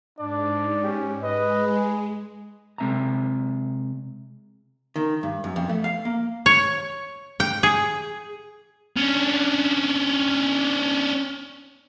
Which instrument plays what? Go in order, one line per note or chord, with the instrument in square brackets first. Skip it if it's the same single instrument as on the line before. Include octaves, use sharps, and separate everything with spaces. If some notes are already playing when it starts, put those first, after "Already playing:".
[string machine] G#2 [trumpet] D4 [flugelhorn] D5
[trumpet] C#4 [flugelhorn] G4
[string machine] G#3 [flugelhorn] B4 [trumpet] D#5
[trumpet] G#4
[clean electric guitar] C3 G#3 C4 E5 A5 A#5
[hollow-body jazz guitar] D#3
G2
F#2
F2
A3
F5
A#3
[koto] C#5
G5
G#4
[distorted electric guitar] C#4 D4